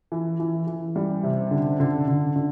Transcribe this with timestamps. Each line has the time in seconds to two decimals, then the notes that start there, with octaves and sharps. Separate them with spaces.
0.12 E3
0.40 E3
0.67 E3
0.96 G3
1.23 C3
1.51 D3
1.80 D3
2.08 D3
2.36 D3